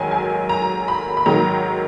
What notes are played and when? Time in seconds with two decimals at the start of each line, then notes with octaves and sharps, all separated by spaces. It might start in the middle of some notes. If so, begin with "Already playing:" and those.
Already playing: G#2 D#3 F#3 G#5
0.11 G#5
0.49 A#5
0.88 B5
1.17 B5
1.26 G#2 D#3 F#3 A#5